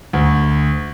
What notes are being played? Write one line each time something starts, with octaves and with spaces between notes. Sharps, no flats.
D2